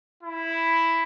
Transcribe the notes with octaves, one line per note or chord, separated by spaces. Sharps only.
E4